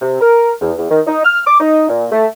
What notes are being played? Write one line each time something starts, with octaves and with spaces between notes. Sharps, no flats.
C3
A#4
E2
E2
D#3
D#4
F6
D6
D#4
A#2
A3